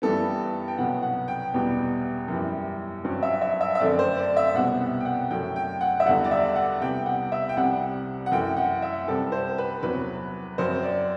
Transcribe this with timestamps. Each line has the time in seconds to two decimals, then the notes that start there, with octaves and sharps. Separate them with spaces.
0.02 G2 E3 G3 B3 A4
0.68 G5
0.78 C2 B2 F#3 B3 F#5
1.03 F#5
1.28 G5
1.54 E2 B2 G3 B3
2.28 F#2 E3 G3
3.04 G2 F#3 C4
3.23 E5
3.42 E5
3.61 E5
3.75 E5
3.80 F#2 D3 A3 C4 D5
3.99 C5
4.18 D5
4.37 E5
4.54 C2 B2 G3 B3 F#5
5.00 G5
5.05 F#5
5.30 F#2 F#3 A3 G5
5.56 G5
5.81 F#5
6.00 E5
6.06 E2 D3 G3 F#5
6.24 D5
6.31 E5
6.55 F#5
6.81 C2 C3 G3 B3 G5
7.06 F#5
7.32 E5
7.49 G5
7.57 C2 C3 G3 C4 F#5
8.26 F#5
8.32 F#2 E3 A3 G5
8.57 F#5
8.82 E5
9.07 C2 C3 G3 C4 A4
9.32 C5
9.58 B4
9.83 E2 C3 F#3 B4
10.58 F#2 F#3 C4 C5
10.83 D5